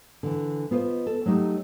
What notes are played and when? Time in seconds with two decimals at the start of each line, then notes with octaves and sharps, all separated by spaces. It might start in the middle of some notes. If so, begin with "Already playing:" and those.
0.23 D3 E3
0.71 B3 F4 C5 D5 D#5
1.06 A4
1.26 F#3 A3 D#4 G4